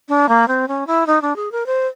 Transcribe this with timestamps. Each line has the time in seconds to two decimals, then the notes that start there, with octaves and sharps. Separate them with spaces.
0.09 D4
0.29 A#3
0.48 C4
0.68 C#4
0.87 E4
1.07 D#4
1.22 D4
1.36 G#4
1.52 A#4
1.66 C5